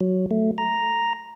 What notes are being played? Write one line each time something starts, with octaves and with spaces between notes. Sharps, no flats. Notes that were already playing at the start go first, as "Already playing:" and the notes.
F#3
A3
A#5